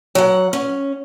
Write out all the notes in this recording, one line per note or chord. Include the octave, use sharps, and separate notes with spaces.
F#3 F#5
C#4